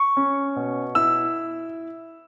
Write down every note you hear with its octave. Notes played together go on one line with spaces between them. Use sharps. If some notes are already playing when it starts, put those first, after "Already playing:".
Already playing: C#6
C#4
B2
E4 E6